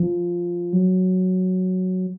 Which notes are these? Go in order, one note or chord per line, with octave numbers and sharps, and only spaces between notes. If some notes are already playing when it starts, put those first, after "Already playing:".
Already playing: F3
F#3